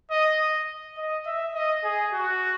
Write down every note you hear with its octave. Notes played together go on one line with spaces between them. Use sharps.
D#5
D#5
E5
D#5
G#4
F#4